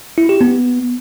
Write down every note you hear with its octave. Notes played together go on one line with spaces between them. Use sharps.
E4
G4
B3